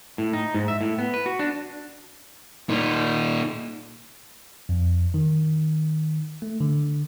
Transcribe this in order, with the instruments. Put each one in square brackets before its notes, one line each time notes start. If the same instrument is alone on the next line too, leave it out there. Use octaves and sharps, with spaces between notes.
[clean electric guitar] A2
D#4
G#2
E5
A2
B3
B4
F#4
D4
[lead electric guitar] A#2 D#4
[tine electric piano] F2
D#3
A3
D3